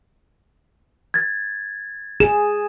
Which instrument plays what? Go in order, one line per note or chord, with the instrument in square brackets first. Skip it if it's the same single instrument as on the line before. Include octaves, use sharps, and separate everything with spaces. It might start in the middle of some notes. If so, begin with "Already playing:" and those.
[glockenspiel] G#6 A6
[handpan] G#4 [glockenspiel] E7